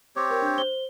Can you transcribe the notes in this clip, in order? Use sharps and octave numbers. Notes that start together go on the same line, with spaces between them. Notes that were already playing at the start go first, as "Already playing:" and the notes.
C4 G4 C#5 D6
A#4
D4 G6
C5 G7